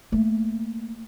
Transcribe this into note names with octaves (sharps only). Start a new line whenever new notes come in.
A3 A#3